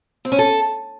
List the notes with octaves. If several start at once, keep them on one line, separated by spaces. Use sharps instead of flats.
C4
C#4
A4